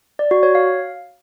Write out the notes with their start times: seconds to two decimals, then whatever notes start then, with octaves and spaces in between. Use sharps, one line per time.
0.19 D5
0.31 F#4
0.43 C#5
0.55 F5